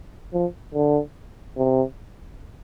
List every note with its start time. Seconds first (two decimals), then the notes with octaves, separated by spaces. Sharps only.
0.33 F3
0.74 D3
1.57 C3